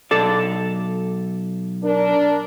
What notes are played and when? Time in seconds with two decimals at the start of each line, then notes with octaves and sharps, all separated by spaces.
0.11 B1 A4 D5
1.84 D4 A#4